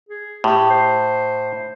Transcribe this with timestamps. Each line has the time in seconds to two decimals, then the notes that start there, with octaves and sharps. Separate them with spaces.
0.09 G#4
0.44 A2 G4
0.70 C5